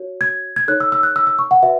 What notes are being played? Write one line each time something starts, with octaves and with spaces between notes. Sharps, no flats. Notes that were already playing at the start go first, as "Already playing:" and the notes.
Already playing: F#4 C#5
G#6
G#6
D#4 A4 C#5 F#6
E6
E6
F#6
E6
E6
C#6
F#5
F#4 B4 E5